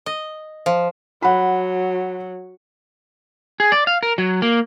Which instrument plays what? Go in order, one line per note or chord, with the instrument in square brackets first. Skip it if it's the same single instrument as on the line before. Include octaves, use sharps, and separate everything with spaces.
[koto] D#5
F3
[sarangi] F#3 [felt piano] F#5 B5
[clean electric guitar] G#4
D5
F5
A#4
F#3
A#3